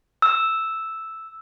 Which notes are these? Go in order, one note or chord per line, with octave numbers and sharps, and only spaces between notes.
E6